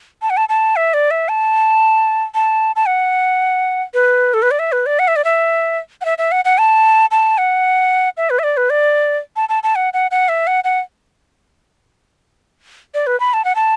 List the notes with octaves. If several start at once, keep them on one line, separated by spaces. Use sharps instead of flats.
A5
F#5
A5
A5
E5
D5
E5
A5
A5
A5
F#5
B4
A4
B4
D5
E5
B4
D5
F#5
E5
D5
E5
F#5
E5
E5
F#5
F#5
A5
A5
F#5
E5
B4
E5
D5
B4
D5
A5
A5
A5
F#5
F#5
F#5
E5
F#5
F#5
D5
B4
B5
A5
F#5
A5